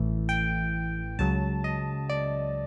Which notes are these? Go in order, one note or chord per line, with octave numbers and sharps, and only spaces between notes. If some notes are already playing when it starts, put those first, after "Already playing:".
Already playing: A1 A2 E3 A3
G5
C#2 C#3 F#3 A5
D#5
D5